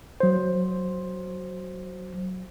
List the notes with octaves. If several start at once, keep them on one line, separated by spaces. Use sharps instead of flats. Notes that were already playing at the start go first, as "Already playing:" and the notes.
F#3 C5